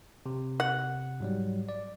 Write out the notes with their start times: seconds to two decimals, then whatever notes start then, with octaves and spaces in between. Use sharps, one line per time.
0.26 C3
0.60 F#5
1.20 G#2 F#3 G3
1.69 D5